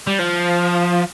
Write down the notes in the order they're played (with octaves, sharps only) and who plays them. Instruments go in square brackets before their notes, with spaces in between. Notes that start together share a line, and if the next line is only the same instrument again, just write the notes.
[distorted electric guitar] G3
F3